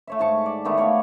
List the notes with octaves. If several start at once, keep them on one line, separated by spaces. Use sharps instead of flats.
A3 C#5 E5
G#2 E5 A5 C#6
D5
D3 D#3 A3 B3
C#5 D5 F5